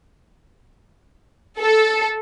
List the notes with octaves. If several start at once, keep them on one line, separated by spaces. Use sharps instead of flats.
A4